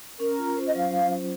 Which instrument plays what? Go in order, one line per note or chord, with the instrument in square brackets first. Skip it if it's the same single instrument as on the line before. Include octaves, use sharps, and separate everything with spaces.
[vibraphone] C#4 [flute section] A#4
[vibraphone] F4
C5
[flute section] D#5
[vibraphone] F#3 [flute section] F5